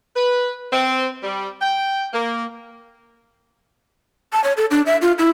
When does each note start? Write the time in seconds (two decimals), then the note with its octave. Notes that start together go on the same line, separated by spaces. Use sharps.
0.15 B4
0.72 C4
1.23 G3
1.62 G5
2.13 A#3
4.33 A5
4.44 C#5
4.57 A4
4.71 D4
4.86 E5
5.02 F4
5.18 E4